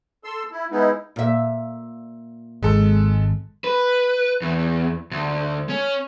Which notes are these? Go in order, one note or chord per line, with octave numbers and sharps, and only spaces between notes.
A4 C6 E6
E4
G#3 B3 D#4 E4
A#2 E5
G#1 G#3 A4
B4
E2
D2
C#4